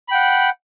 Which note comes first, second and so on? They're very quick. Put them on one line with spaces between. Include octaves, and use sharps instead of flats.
B5 G5 F#5